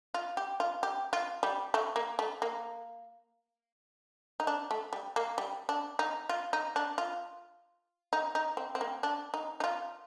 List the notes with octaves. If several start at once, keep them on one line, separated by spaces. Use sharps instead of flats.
F4
G4
F4
G4
F4
G3
A3
A#3
A3
A#3
D#4
D4
A3
G3
A#3
G3
D4
D#4
F4
D#4
D4
F4
D#4
D#4
C4
C4
A#3
D4
D#4
D#4
F4